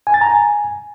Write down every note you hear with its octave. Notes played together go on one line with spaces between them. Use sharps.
G#5
A6
A#5
G#5